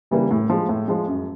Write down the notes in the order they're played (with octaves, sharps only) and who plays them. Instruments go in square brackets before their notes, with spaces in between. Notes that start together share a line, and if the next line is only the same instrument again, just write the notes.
[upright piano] C#3 E3 G3 A#3
A2
F3 G#3
A2
F3 G#3
F#2